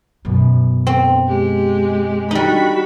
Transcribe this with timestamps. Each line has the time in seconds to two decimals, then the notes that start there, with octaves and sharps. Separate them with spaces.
0.25 F#2 B2
0.87 C4
1.28 G#3 G4
2.31 G3 D#4 F#4 B5